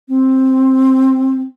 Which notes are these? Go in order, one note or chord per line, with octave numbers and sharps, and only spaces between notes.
C4